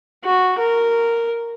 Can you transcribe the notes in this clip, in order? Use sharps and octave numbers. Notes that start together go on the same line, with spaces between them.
F#4
A#4